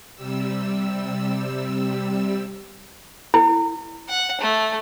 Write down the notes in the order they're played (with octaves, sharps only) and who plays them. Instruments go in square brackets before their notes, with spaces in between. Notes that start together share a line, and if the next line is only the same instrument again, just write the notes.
[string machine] C3 G3 E6
[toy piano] E4
[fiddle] F#5
A3